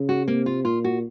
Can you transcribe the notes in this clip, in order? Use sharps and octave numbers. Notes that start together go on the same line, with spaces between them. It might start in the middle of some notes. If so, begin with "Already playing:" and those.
Already playing: C#3
F#4
C3 A#3
F4
A#2 F4
F#4